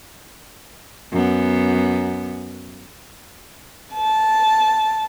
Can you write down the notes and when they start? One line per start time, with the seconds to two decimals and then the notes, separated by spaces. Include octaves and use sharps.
1.12 F#2 B3
3.93 A5